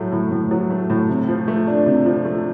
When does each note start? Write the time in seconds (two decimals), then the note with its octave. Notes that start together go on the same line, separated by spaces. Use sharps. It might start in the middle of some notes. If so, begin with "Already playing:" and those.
Already playing: A2 F#3 A3
0.12 A2
0.32 A2
0.51 F#3
0.70 A3
0.90 A2
1.09 C3
1.29 F3
1.48 A3
1.67 D4
1.86 C3
2.06 F3
2.25 A3